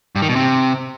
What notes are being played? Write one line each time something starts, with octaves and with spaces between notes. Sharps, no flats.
G2
D#3
B2
C3